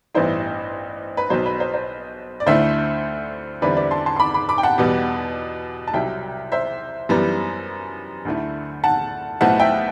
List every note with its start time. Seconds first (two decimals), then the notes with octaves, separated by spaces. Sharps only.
0.15 A1 G2 E3 B3 E4 C5
1.17 B4
1.30 B1 B2 F#3 C5
1.46 B4
1.60 C5
1.74 C5
2.40 D5
2.46 D2 D3 A3 E4 C5 E5
3.62 E2 D3 G3 C4 E4 B4 D5
3.76 B4 D5
3.91 A5 C6
4.06 A5 C6
4.16 C6
4.20 B5 D6
4.34 B5 D6
4.49 B5 D6
4.58 G5
4.63 F#5 A5
4.78 E2 B2 G3
5.88 A5
5.94 C2 C3 F#3 E5 G5
6.52 C5 E5
7.09 F#2 E3 G3 B3
8.25 D2 D3 A3 E4
8.84 F#5 A5
9.41 B1 B2 A3 C4 E4 F#5 A5
9.60 E5 G5